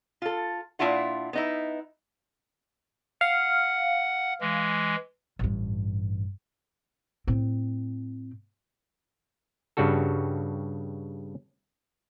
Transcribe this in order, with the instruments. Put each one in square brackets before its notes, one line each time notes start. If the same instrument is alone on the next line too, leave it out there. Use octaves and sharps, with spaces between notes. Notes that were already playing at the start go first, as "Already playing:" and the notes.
[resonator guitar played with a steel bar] F4 A4
A#2 C4 D4 E4 F4 F#5
B3 D#4 E4
[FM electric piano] F5 [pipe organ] F#5
[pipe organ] E3 G#3
[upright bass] A1 G2
A2 C4
[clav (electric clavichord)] G2 C#3 G3 F#4 A4